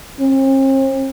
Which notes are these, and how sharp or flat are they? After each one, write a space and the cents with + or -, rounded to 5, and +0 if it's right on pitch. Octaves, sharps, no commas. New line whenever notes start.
C4 +45